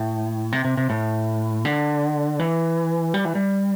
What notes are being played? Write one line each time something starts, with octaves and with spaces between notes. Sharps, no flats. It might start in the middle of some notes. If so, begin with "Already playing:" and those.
Already playing: A2
C3
C3
C3
A2
D3
E3
G3
E3
G3